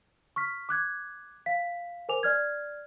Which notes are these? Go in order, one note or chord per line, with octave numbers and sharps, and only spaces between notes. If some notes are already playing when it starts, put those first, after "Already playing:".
C#6 F6 B6
D6 F#6 G#6
F5 B6
A#4 C5 G#5 D6 F7
D5 F6 G#6